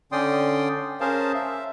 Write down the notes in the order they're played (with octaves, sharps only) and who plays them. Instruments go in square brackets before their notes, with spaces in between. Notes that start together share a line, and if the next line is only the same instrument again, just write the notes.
[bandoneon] D3 C#4 D5 G5 C6 D#6
C#4 G#4 A#4 C5 F5 A5
E5